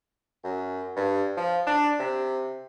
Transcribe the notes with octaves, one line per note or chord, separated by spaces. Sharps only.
F#2
G2
F3
D4
C3